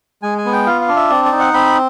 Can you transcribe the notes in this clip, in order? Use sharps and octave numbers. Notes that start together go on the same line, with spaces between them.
G#3 G#5
G#5
B3
G5
F4 F5
F5
D4
E5
C4 D5
D5
D#4
F#5
C4 B5